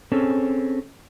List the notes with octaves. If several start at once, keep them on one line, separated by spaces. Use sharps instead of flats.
C4 C#4 G#4 A4